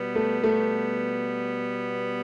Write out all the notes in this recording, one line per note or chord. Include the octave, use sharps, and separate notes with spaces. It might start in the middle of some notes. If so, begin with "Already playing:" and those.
Already playing: B2 G3 B3
A3
A3